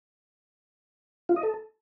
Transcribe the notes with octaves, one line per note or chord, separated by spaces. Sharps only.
F4
D#5
A4